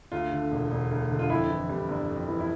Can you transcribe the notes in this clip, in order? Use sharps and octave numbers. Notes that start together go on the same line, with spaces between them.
D2 F4
D3
E1
E1
D2
D3
F4
F2 E4
E3
G3
G1
F2
E3
E4